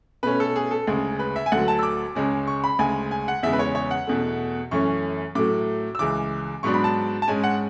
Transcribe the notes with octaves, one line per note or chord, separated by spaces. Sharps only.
B2 A3 C#4 B4
A4
G#4
A4
D2 C#3 G#3 G#4
B4
E5
G#5
D2 D3 F#3 F#5
A5
E6
D6
C#2 C#3 G#3 C#4
C#6
B5
D2 C#3 G#3 G#5
G#5
F#5
E2 C#3 G#3 E5
B4
C#5
C#5
F#5
E2 B2 A3
F#2 E3 A3 C#4 C#6
A2 F#3 A3 D6
E6
C#2 C#3 E3 D6
G#2 F#3 B3 D4 C#6
B5
A5
A5
G#2 G#3 C#4 G#5
F#5